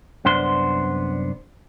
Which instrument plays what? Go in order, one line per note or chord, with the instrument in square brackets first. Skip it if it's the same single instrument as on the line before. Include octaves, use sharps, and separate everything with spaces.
[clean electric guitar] C2 F#2 B3 D4 C5 C6